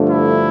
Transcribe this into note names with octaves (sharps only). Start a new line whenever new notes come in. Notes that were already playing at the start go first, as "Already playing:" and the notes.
Already playing: G2 D3 F3 A3
E4